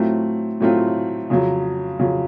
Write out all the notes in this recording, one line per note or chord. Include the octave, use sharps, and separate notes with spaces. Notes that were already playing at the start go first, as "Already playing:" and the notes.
Already playing: A2 F#3 A3 C4 F4
A2 F#3 A3 C4 F4
F2 C#3 F#3
F2 C#3 F#3